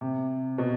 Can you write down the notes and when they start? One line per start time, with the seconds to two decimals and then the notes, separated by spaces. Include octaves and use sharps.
0.01 C3
0.58 B2